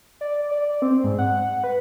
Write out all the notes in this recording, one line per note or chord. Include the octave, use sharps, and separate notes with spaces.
D5
D5
C4
G#2
F#5
B4